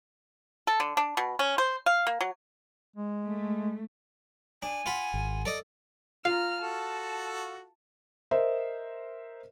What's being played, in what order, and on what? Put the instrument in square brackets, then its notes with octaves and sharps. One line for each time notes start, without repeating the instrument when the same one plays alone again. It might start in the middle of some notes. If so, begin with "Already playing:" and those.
[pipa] A4
D3
D4
B2
C#4
C5
F5
A#3
F#3
[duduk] G#3
[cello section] A3
[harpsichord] D4 [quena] G#5
[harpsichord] F4 F#5 B5
[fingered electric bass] G#1
[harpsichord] A4 D5 D#5
[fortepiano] F4 [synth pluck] F5 [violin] A#5 F6
[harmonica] F#4 A4 [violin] A5
[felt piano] A#4 C5 D#5 E5